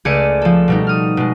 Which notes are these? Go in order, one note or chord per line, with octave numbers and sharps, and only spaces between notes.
C#2 A3 G#4 D5 C#7 D#7
F3 A4
B2 G3 D#4
D#6 F6
B2 G#3